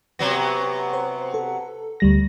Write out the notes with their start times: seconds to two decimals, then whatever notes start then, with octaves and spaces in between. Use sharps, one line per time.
0.19 C3 F#3 B3 A#6
0.93 C5
1.34 A4
2.00 D2 G3 A#6